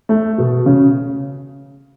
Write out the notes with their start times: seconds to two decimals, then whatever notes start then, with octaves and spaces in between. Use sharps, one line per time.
0.09 A3
0.38 B2
0.66 C#3